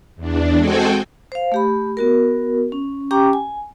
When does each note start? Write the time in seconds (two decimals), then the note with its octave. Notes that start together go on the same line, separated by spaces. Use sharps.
0.16 E2 D4
0.57 G#3 C4 F#4 A4 G5 G#5
1.32 C5 F5
1.52 A3 G4 B5
1.97 B3 F#4 A#4
2.72 C#4
3.11 C#4 G4 G5 A#5 D6
3.33 G#5